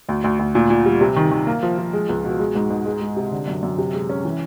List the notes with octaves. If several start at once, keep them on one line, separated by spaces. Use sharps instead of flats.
D2
D2
D2
A#2
A#2
G3
C3
D#3
D#3
A#3
F3
F3
G#3
C#2
B2
G#3
G#2
G#2
G#3
G#3
C3
D3
F#2
F#2
C3
G#3
C#4
E3